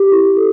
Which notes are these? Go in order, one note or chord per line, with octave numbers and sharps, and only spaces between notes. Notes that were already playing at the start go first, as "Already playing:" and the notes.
Already playing: G4
E4
A4